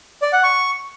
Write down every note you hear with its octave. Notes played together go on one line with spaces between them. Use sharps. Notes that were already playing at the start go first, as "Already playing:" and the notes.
D5
F#5
C#6